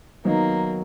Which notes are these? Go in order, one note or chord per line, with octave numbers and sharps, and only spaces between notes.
D#3 F#3 A#3 B3 D#4